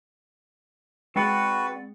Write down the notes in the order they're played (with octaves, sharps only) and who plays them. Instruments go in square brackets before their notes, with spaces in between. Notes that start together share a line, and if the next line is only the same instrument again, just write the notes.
[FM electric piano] G#3 [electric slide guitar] C4 D5 F#5 [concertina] F#4 B4